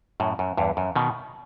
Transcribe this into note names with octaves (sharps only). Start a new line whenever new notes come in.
F#2 A2
F#2
E2 G2
F#2
B2 D#3